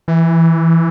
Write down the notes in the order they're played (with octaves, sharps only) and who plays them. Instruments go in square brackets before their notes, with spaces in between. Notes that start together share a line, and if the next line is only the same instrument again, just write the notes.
[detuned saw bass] E3